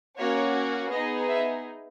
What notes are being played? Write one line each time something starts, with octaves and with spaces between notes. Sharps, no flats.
A#3 C#4 F#4 C#5
B3 D#4 G#4 D#5
E5